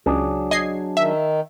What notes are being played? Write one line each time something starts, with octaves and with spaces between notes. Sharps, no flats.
C#2 F#3 D4 G#4
D#5 G#6 C7
D#3 E5